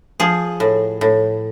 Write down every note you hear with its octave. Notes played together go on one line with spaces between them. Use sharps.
F3 G#4
A2
A2